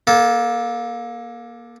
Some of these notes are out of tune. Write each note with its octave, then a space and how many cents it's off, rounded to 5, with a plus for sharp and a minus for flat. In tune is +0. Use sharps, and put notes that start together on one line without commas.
A#3 +20 A4 -20